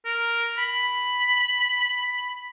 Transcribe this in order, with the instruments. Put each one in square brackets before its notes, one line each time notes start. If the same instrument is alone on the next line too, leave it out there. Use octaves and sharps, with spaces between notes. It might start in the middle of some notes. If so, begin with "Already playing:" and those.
[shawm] A#4
B5